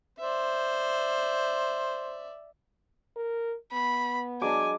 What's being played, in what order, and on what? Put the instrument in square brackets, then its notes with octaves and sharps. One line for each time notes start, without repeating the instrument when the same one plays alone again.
[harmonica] C5 [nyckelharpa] D5 E5
[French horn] A#4
[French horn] B3 [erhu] B5
[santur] F#3 G#3 D4 [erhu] G#5 [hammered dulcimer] D6